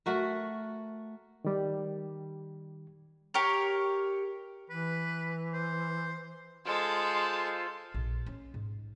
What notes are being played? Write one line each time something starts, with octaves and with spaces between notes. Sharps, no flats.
A3 F#4 A#4
D#3 G3
G4 A#4 C#5
E3 B4
C5
G#3 F4 A4 C5
A#1
C#4
G#2